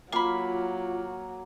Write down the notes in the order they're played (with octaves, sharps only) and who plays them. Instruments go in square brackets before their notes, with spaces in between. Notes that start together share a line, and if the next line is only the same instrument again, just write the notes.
[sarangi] F#3 [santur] A#3 [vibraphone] F4 [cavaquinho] F5 B5